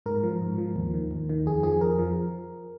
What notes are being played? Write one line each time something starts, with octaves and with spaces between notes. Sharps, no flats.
G#2 A#4
F3
G#2
F3
D#2
D#3
D#2
D#3
F2 G#4
F3 G#4
F2 A#4
F3